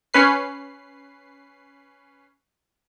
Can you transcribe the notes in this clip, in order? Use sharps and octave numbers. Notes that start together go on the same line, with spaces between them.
C#4 B4 C7